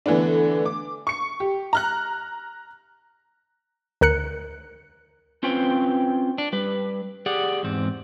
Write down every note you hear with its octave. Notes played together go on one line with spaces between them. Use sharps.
D3 E3 A3 B3 D4
D6
C#6 C#7
G4
A#5 F6 F#6
D2 A#4 F#6 C#7
C4 C#4 F4 B4 C5 G5
D4
G3 B4
G4 G#4 D5 F#5
E2 G#2 C4